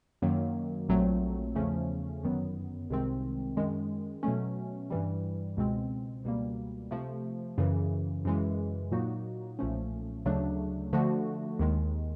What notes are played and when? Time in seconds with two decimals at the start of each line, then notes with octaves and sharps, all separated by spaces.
0.22 F#2 D#3 F#3 A#3
0.89 A#1 A#2 F#3 A3 C4
1.55 E2 C#3 F3 A3 C#4
2.23 G1 F#2 D#3 F#3 B3
2.90 C2 C3 D#3 G#3 C4
3.57 F#2 D#3 G#3
4.23 B2 F#3 A3 C#4
4.90 G2 E3 G3
5.57 C#2 B2 G#3 C4
6.24 C#2 B2 G3 A#3
6.91 C3 F3 A3
7.58 F#2 C#3 E3
8.25 F#2 C#3 E3 G#3
8.92 A#2 F#3 A#3 D#4 F#4
9.59 B1 A#2 F3 A3 C#4
10.25 D2 C#3 F#3 A3 D4
10.93 D3 F3 A3 D4 F#4
11.59 D#2 D#3 G#3